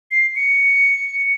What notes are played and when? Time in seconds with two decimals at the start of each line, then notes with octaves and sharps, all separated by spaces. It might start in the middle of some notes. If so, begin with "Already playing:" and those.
0.11 C7
0.36 C#7